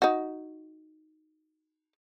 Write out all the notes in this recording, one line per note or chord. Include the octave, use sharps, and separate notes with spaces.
D#4 F#4